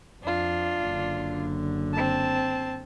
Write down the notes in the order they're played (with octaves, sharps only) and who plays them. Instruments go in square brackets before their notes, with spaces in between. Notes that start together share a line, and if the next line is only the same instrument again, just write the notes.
[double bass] F2 [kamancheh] D4 F4
[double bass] F#1 D3
[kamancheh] C4 A5